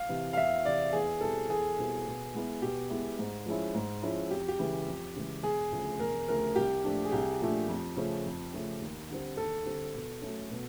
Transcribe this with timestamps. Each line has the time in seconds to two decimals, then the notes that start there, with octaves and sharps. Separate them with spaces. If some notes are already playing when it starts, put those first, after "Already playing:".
Already playing: F5
0.09 C3 E3
0.33 F5
0.37 E2 E5
0.65 C3 E3 D5
0.93 E2 G#4
1.21 B2 G3 C4 E4 A4
1.49 E2 G#4
1.77 B2 G3 C4 E4
2.06 B2
2.34 G#3 B3 E4
2.62 B2 G4
2.90 G#3 B3 E4
3.19 G#2
3.46 F3 G#3 C#4 E4
3.75 G#2
4.02 F3 G#3 C#4 E4
4.31 F2 G4
4.48 G4
4.59 C#3 E3 G#3
4.87 F2
5.16 C#3 E3 G#3
5.43 E1 G#4
5.72 D2 C#3 F3 A3
5.99 E1 A#4
6.28 D2 C#3 F3 A3 A#4
6.55 C2 G4
6.84 A#2 F3 A3 D4
7.05 G#4
7.12 C2 G4
7.40 A#2 F3 A3 D4
7.68 F2
7.96 C#3 F3 A3 C#4
8.25 F2
8.53 C#3 F3 A3 C#4
8.80 D#2
9.10 D3 G3 C4
9.37 D#2 A4
9.66 D3 G3 C4
9.94 B2
10.21 F#3 A3 C#4
10.50 B2